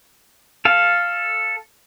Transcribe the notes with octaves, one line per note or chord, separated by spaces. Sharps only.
A4 F5